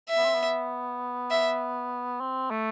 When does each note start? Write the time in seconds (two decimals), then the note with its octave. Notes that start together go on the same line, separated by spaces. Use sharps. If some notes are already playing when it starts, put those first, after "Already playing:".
0.09 E5
0.17 B3
0.25 C4
0.34 B3
1.30 E5
2.20 C4
2.50 A3